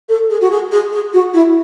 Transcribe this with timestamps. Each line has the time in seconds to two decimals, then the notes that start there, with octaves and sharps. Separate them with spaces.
0.08 A4
0.29 G#4
0.40 F#4
0.50 G#4
0.71 G#4
0.92 G#4
1.13 F#4
1.33 E4